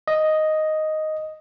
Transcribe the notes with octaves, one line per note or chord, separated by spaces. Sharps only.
D#5